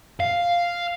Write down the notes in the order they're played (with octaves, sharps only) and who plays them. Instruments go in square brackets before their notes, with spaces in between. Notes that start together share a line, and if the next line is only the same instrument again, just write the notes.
[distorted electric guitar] F5